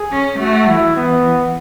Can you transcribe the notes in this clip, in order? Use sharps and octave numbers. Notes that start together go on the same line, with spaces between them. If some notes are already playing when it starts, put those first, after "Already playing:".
Already playing: G#4
C#4
A3 F#4
E3 E4
E3 B3